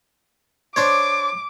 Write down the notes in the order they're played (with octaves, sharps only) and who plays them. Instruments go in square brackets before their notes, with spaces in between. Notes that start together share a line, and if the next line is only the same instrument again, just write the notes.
[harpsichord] D4 C5 C#5 [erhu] D6